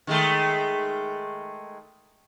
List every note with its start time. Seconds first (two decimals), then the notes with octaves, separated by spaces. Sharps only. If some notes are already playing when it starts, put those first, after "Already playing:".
0.07 D#3 G#3 A3